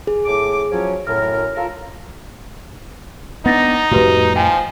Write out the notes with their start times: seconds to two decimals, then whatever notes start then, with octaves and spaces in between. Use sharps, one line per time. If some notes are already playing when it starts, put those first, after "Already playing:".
0.07 G#4
0.25 A2 D6
0.71 F3 F#3 C#4
1.07 F#2 A2 A#4 F6
1.56 F4 A4 A#4
3.46 B3 D4 D#4 F#5 A6 A#6
3.91 F2 A2 F#4 G4 B4
4.36 F3 G5 G#5